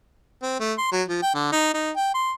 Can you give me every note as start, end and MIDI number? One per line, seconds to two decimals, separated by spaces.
0.42 0.59 60
0.60 0.73 57
0.78 0.88 84
0.92 1.03 54
1.08 1.22 53
1.22 1.31 79
1.34 1.49 50
1.52 1.71 63
1.74 1.91 63
1.96 2.14 79
2.14 2.32 84